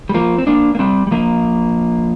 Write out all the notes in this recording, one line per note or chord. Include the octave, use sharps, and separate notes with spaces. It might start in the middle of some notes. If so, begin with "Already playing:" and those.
G3
F3 A#3
C4
A#3 D4
A#3
G3 C4
G3
F3 A#3